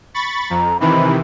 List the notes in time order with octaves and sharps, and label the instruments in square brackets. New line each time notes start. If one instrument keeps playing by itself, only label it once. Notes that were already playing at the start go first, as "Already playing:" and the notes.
[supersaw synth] B5 C#6 A6
[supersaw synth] F2 [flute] A#5
[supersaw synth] C3 D#3 E3 [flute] B5